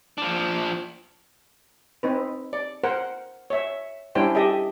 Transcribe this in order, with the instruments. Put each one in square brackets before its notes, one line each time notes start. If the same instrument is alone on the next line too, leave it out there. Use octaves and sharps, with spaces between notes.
[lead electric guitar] F3 D4
[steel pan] C4 D#4 B4
D5
A#4 C5 F#5
C#5 E5
G3 C#4 D4 E4 C5 G5
G4 A4 D#5 E5